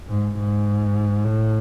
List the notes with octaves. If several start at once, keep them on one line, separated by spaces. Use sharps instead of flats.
G#2
G#2
A2